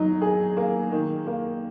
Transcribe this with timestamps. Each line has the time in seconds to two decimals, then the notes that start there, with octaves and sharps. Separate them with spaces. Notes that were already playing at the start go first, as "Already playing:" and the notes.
Already playing: F#3 D#4
0.22 G#4
0.57 A#3
0.92 D#3
1.27 A#3